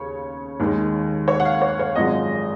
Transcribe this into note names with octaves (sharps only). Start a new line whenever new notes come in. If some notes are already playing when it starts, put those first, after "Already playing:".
Already playing: D#2 C#3 C#5
D#2 D#3 G#3
C#5
F#5
F5
C#5
C#5
G#1 F#2 F3 G#3 D#5